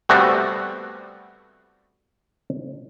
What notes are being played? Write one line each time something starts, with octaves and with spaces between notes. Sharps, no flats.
G3 A3 B3 C4 F#4